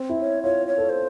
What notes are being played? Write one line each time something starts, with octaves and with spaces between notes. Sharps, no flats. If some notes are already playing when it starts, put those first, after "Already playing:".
Already playing: C4
E4
C#5
F4 C#5
C#5
A4
C5